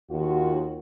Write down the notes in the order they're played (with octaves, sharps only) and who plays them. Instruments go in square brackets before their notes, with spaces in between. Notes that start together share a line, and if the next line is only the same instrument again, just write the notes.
[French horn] D#2 [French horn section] F4 F#4